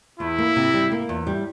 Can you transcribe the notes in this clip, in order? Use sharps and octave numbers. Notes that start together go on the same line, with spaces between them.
E2 E4
A#3
C3
G3
A#3
E2
G3